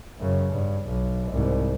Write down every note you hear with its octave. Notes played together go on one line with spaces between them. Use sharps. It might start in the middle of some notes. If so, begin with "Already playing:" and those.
F#2 C#3
G2
B1
C2 G#2